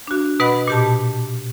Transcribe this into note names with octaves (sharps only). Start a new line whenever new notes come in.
D4 F#4
B2 B4 D#5 F#5 B5
A#2 G4 A5